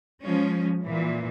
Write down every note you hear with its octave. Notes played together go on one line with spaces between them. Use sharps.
F3 G#3 C#4
A#2 E3